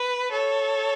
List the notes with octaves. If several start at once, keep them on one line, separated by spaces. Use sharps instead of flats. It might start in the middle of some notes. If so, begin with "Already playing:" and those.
Already playing: B4
A4 C#5